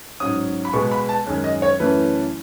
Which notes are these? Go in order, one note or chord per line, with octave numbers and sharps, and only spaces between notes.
G#2 F#3 C#4 D#6
B5
B2 G#3 B3 C#6
B5
A5
F#2 D#3 G#3 C#4
D#5
C#5
F#2 E3 A3 C#4 B4